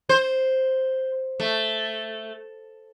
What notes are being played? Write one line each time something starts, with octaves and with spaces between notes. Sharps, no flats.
C5
A3